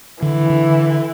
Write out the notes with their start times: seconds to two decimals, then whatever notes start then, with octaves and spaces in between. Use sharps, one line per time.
0.22 D3 E3
0.50 D3